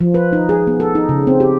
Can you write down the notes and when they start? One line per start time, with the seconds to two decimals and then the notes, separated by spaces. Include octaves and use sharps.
0.01 F3
0.14 B4
0.33 D#4
0.49 G#4
0.67 B3
0.80 A4
0.95 D#4
1.09 C#3
1.27 C4
1.40 G4